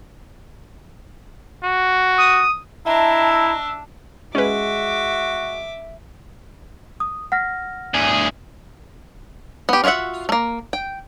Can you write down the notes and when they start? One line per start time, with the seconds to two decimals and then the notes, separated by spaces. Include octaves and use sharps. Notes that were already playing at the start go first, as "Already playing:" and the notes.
1.63 F#4
2.18 D#6
2.86 D4 E4 D#5 E5 A5 A#5
4.35 G#3 C#4 F#4 B4 E5 D6
7.00 D#6
7.32 F#5 F6 A#6
7.94 D2 G#4
9.69 B3 G4
9.84 F4 F#4 C#5 E5 F#5
10.29 A3 A#3
10.73 G5